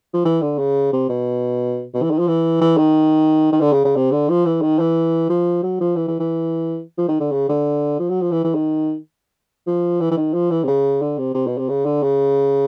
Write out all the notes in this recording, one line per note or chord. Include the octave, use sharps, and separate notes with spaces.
F3
E3
D3
C#3
C3
B2
B2
E3
D#3
F3
E3
E3
D#3
D#3
D3
C#3
C#3
C3
D3
F3
E3
D#3
E3
F3
F#3
F3
E3
E3
E3
F3
D#3
D3
C#3
D3
F3
F#3
F3
E3
E3
D#3
F3
E3
E3
D#3
F3
E3
C3
C#3
D3
C3
C3
B2
C3
C#3
D3
C#3